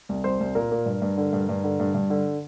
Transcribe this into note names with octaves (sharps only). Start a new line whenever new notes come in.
C2
C2 C5
C2
A#2 A#4
A#2
G2
G2
D3
G2
G2
D3
G2
G2
D3